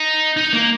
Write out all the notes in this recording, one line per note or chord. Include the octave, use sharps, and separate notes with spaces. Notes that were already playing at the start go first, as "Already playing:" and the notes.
Already playing: D#4
D#4
A#3